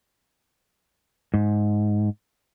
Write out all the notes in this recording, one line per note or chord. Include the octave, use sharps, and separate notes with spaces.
G#2